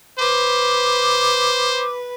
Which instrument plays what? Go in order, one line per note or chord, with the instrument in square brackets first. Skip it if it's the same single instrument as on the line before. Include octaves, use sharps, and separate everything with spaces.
[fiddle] B4 [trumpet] C5 [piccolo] D6